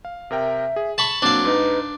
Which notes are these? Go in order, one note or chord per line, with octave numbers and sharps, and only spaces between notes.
F5
C3 A#4 E5 G5
G#4
A5 B5 C#6 E7
F#3 A#3 C4 D4 F5
G#2 D#4 B4